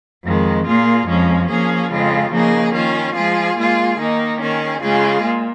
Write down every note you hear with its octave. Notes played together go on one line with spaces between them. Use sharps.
F2 D#3 G#3
A#2 A#3 F4 G#4
F2 F3 G#3 C#4
F3 A#3 C#4 G#4
F2 C#3 G#3 F4
C#3 F3 A#3 D#4 G#4
D#3 C#4 F4
F3 G#3 F4 G#4
A#2 G#3 F4 G#4
D#3 A#3 D#4
D#3 C#4 G#4
C#3 G#3 F4 G#4
A#2